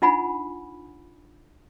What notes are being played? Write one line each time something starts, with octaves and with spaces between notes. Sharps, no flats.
D4 D#4 F4 F#5 G#5 B5